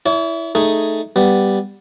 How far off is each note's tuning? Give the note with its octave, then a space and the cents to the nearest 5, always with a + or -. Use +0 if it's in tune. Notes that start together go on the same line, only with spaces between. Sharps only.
E4 +0 C#5 +45
A3 +0 D#4 +0 G#4 +0
G3 +0 B3 +0